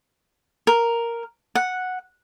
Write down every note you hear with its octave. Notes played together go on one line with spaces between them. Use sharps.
A#4
F#5